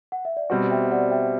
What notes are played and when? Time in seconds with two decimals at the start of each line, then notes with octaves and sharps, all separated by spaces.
0.12 F#5
0.25 E5
0.37 D5
0.50 B2 G3 C4 F#4 C5
0.71 E5 G5
0.91 D5 F#5
1.11 E5 G5